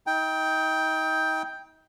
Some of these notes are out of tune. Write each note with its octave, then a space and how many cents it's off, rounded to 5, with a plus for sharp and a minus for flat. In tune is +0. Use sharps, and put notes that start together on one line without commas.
D#4 +35 G5 +5